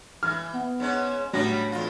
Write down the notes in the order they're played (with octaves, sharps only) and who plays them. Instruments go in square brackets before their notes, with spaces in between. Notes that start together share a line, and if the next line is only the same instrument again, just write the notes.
[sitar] E3 [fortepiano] F6
[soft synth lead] B3
[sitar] G#2 C#4
[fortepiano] A2 D3 F#3 [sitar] G3 B3 C#4 [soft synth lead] A#6
[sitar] E2 F4